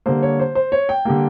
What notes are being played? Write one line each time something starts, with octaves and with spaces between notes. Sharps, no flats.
D3 G3 A#3 C5
C#5
C5
C5
C#5
G5
D3 G3 A#3